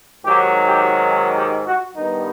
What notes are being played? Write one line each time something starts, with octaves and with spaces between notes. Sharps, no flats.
G#2 D#3 F#3 G4
G4
G#4
G4
F#4
G2 D#3 G3 B3 D#4